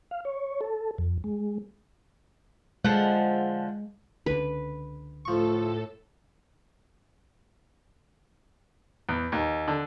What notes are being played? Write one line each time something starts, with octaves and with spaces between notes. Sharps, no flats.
F5
C#5
A4
F2
G#3
D3 F3 G#3 F#5
C#2 D3 B4
A2 F3 A4 C#6
E2
D#2
D3